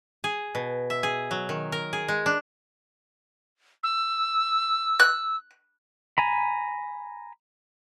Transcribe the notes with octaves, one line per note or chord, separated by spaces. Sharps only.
G#4
B2
E5
G#4
F#3
D#3
A#4
G#4
G#3
D4
E6
F#6
G#5 A#5 B5